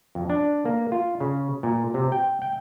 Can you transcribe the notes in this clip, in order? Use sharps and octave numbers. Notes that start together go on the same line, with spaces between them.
F2
D4
A#3
F4
C#3
A#2
C3
G5
G5